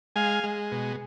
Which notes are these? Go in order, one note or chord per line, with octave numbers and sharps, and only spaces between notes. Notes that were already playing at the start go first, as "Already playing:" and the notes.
G#3 F5 G#5
G#3
B2